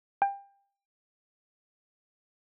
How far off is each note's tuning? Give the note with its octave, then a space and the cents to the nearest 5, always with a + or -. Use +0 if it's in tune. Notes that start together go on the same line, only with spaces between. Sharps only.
G5 +25